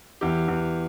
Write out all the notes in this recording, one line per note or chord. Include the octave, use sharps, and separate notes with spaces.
E2 G4
E2